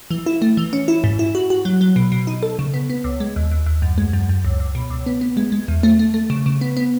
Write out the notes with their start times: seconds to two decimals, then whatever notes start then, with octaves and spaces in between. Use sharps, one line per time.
0.11 E3
0.26 E4
0.42 A3
0.57 E3
0.73 C#4
0.88 E4
1.04 G#2
1.19 E4
1.35 F#4
1.50 F#4
1.65 F#3
1.81 F#3
1.96 B2
2.12 B2
2.27 D#4
2.43 A4
2.59 C#3
2.74 B3
2.90 B3
3.04 C#2
3.20 G#3
3.36 D#2
3.51 D#2
3.66 D#2
3.82 F#2
3.98 G#3
4.13 F#2
4.29 F#2
4.45 C#2
4.60 C#2
4.75 B2
4.90 C#2
5.06 B3
5.21 B3
5.37 G#3
5.52 G#3
5.68 E2
5.83 A3
5.99 A3
6.14 A3
6.30 C#3
6.46 C#3
6.61 B3
6.77 B3